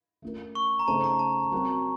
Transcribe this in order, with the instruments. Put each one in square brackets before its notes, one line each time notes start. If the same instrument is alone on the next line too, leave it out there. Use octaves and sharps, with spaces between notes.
[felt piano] A3 C#4 F4 A#4
[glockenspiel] C#6
A#5
[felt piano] C#3 A3 D#4 A4 C5 [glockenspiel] A5
[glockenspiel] A#5
A5
[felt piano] F#3 C4 F#4 A#4